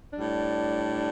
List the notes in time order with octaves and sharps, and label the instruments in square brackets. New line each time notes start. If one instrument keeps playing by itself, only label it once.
[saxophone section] A2 G3 D4